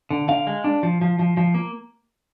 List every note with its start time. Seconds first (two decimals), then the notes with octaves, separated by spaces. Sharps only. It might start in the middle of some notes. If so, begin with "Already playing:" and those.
0.11 D3
0.28 D3 F5
0.47 G#3
0.64 D4
0.83 F3
1.01 F3
1.19 F3
1.37 F3
1.54 A#3